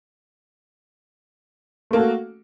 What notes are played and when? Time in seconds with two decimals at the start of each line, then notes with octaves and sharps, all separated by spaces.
1.91 A3
1.93 A#3
1.96 A4
1.98 F#4